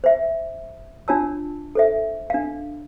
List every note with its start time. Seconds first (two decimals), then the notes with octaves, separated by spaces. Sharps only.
0.04 C5 E5
1.08 D4 F4 C#5 A5 E6
1.75 A4 C5 E5
2.30 D4 F5